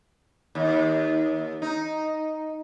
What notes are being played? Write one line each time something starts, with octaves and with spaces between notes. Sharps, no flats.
D#2
D#4